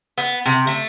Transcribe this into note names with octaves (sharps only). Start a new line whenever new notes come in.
B3
C3
A3